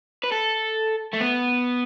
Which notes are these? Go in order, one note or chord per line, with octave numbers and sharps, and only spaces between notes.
B4
A4
A3
B3